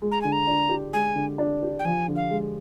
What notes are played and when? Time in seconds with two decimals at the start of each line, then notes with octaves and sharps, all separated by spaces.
0.02 G#3
0.11 A#5
0.21 D3 G#5
0.32 A#5
0.47 D4
0.69 G4
0.93 G#3 G#5
1.15 D3
1.38 D4
1.62 G4
1.79 G5
1.85 F3 G#5
2.08 D3
2.16 F5
2.30 G#3